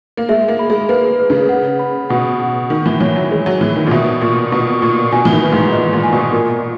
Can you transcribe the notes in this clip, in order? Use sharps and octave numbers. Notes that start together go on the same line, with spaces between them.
A#3
G#3 E5
A#3
B5
G#3
A#3 B4
B4
C#3
F#5
B5
B2 F#5
F#5
D#3 C#6
E3
E3 C#5
F#3
G#3 C#5
F#3
E3 C#5
D#3
A#2
B2 E5
A#2 C#6
B2 C#6
A#2 C#6
B2 G#5
E3
D#3
B4
G#2
A#2 D#5
A#2
G#5
B2
A#2 A#4